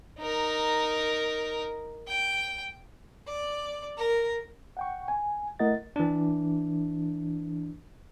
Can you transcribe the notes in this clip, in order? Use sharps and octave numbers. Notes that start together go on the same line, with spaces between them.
D#4 A#4
G5
D5
A#4
F#5 G5 C#6
G#5
A3 E4 A#4 D#5 F#5 A6
E3 D4